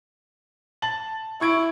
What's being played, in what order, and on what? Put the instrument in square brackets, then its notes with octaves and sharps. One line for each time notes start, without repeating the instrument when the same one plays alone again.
[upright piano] A5 A6 F#7
[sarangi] E4 [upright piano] C#6 G#6 D7